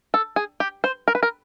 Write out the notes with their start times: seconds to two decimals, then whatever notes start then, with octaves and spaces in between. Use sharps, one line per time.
0.14 A4
0.36 G#4
0.60 G4
0.84 C5
1.08 A#4
1.15 B4
1.23 A#4